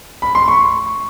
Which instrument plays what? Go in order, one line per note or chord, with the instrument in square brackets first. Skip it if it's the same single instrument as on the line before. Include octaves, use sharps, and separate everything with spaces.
[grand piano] B5
C6
C#6